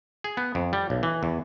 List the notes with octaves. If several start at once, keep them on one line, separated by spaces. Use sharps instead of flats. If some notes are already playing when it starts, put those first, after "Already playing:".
G#4
B3
F2
G3
B1
E3
E2